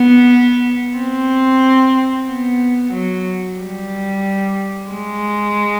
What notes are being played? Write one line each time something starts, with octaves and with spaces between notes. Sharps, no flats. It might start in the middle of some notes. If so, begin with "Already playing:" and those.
Already playing: B3
C4
B3
F#3
G3
G#3